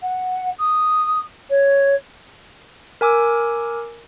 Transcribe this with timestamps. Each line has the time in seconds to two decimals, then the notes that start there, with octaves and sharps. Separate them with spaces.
0.02 F#5
0.59 D#6
1.50 C#5
3.01 A#4 G#5 D6 E6